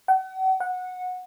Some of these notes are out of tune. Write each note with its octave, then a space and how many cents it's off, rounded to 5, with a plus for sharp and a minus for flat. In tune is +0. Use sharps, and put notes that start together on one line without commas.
F#5 +40
F#5 -15